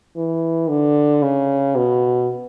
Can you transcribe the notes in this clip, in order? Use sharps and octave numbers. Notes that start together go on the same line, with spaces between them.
E3
D3
C#3
B2